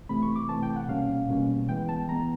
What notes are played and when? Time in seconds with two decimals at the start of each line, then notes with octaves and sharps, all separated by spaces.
0.09 C3 E3 A3 C4 B5
0.22 C#6
0.36 D6
0.48 C3 E3 A3 C4 A5
0.63 G5
0.76 F#5
0.88 B2 G3 A#3 C#4 F5
1.28 B2 G3 A#3 C#4
1.68 E3 G#3 B3 G5
1.89 A5
2.08 E3 G#3 B3 A#5